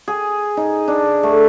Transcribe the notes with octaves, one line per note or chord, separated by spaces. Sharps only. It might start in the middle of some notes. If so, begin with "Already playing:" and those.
G#4
D#4
D4
A3